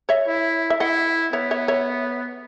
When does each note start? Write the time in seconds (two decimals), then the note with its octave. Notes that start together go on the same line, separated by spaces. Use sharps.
0.09 C#5 E5
0.27 E4
0.70 E5
0.80 E4 D#5 F#5
1.33 B3 C#5 E5
1.51 C#5 E5
1.68 C#5 E5